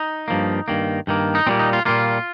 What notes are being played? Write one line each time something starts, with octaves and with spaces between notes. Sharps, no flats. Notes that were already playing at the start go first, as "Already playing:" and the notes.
Already playing: D#4
G2 F3 A#3
G2 D#3 A#3
G2 D#3 A#3
D#4
A#2 G3 A#3 C4
D#4
F4
A#2 G3 A#3 F4